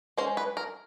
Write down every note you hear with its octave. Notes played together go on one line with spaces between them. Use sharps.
G#3 C#4 C5
B4
A#4